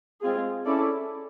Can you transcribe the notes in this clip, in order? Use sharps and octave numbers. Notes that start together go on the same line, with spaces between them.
G#3 C4 F4 G#4
C#4 E4 A4 D5